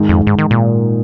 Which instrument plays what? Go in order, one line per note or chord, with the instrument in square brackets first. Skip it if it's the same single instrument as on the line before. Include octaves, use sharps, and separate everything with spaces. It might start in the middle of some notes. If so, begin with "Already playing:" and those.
Already playing: [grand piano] G#2 D#3 G#3 D#4
[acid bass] F2
G#2
D#3
A#2